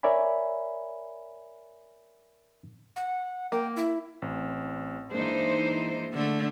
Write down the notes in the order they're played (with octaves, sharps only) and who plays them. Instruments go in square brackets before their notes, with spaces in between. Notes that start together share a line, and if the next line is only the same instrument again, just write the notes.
[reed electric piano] A#4 C#5 D5 E5 G#5 B5
[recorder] F#5
[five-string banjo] A#3 [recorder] G5
[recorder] E4
[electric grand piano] A1 C4
[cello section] E3 D#4 C5 [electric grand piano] G#3 A#3 D4
[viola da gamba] D3 A3